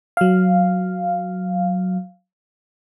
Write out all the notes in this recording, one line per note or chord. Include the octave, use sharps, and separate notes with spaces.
F#3 F5